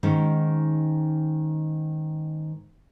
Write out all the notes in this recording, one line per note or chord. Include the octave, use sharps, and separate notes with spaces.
G#2 D#3 C#4